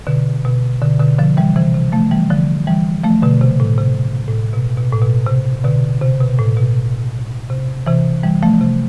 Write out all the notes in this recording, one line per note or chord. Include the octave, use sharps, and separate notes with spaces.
B2 D3
B2
B2 D3
B2 D3
D3 F3
E3 G3
C3 E3
C3
F3 A3
E3 G3
D3 F3
E3 G3
F3 A3
B2 D3
C3
A2
C3
A2
B2
B2
A2
B2
C3
B2 D3
C3
B2
A2
B2
C3
C3 E3
E3 G3
F3 A3
C3